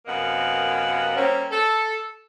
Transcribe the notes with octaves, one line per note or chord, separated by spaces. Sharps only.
F#2 C3 A#3 B3 D#5 F#5
G3 A#3 C4 C#4
A4